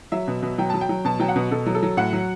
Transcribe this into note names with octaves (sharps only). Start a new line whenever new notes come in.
F#3 E5
B2
B2
F#3 G5
F#3 A5
G5
F#3
B2 A5
F#3 G5
F#5
B2
B2 A4
F#3
A4
F#3
A2 F#5
F#3